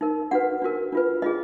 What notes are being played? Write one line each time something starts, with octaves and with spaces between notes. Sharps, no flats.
D#4 A#4
D4 F#4 B4 F#5
D4 F#4 A#4
D4 F4 B4
D4 F4 G#4 D#5